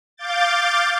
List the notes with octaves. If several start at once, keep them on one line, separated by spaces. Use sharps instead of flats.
F5 D6 G6 A6